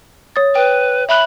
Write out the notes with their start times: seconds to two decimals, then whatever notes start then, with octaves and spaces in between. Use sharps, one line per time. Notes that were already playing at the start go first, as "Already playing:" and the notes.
0.36 C#5 D#6 A6
0.55 B4 G5
1.09 E5 B5 F#6